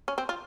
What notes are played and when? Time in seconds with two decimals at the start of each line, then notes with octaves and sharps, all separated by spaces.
0.08 C#4
0.18 C4
0.29 F4